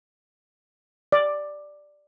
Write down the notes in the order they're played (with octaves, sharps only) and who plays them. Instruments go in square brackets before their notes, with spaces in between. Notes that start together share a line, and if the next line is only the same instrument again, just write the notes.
[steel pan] D5